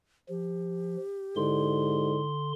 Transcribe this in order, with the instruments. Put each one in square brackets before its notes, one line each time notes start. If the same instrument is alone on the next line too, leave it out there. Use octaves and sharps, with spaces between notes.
[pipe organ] F3 [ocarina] G4
[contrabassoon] G#2 [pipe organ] D3 C6 [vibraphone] E4 A4 D5